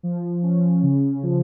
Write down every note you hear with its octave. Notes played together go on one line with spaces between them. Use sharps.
F3
C#4
C#3
F3